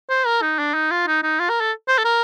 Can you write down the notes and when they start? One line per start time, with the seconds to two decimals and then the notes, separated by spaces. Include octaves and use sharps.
0.10 C5
0.26 A#4
0.42 D#4
0.59 D4
0.74 D#4
0.91 F4
1.08 D#4
1.23 D#4
1.40 F4
1.50 A#4
1.61 A4
1.88 C5
1.98 A4
2.05 A#4